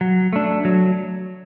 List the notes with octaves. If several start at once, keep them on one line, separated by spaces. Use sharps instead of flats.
F#3
A3 D4
F#3